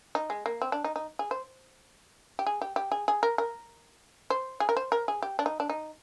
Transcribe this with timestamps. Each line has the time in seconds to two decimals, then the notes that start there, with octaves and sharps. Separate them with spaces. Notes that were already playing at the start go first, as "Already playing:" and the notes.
0.15 D#4
0.30 G#3
0.46 A#3
0.62 C4
0.72 D4
0.84 D#4
0.96 D#4
1.19 G#4
1.31 C5
2.39 G4
2.47 G#4
2.62 G4
2.76 G4
2.92 G#4
3.08 G#4
3.23 A#4
3.38 A#4
4.30 C5
4.60 G#4
4.69 A#4
4.77 C5
4.92 A#4
5.08 G#4
5.22 G4
5.39 D4
5.46 D#4
5.60 D4
5.70 D#4